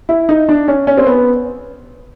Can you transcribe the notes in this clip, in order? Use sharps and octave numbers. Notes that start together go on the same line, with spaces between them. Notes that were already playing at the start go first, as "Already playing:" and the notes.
E4
D#4
D4
C#4
C#4
C4
B3